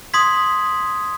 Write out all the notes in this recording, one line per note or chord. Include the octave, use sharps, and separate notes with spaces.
C6 D#6 G#6 B6